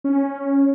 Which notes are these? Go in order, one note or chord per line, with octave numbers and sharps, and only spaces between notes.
C#4